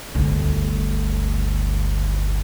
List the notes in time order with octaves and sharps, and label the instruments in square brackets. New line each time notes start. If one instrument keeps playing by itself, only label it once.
[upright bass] G1 D2